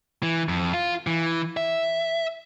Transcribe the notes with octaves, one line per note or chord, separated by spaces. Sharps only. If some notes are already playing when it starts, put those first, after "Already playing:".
E3
F2
F4
E3
E5